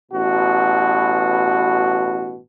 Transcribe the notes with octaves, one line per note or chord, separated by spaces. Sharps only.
A1 B2 F#4